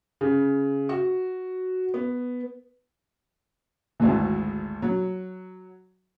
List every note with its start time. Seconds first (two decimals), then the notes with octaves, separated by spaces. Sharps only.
0.21 C#3
0.89 F#4
1.94 B3
4.00 G#1 D2 G#2 E3
4.82 F#3